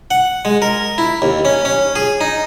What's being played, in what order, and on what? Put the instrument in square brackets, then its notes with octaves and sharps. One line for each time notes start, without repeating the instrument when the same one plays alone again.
[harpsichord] F#5
G#3
A#4
E4
D#2
C#4
C#4
G#4
D#4